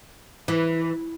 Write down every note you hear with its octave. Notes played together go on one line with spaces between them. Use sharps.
E3